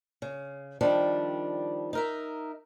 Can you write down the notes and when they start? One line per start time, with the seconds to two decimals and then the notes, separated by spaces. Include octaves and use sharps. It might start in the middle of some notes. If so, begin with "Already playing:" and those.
0.22 C#3
0.81 D#3 F3 G3 D4
1.93 D#4 A#4 E5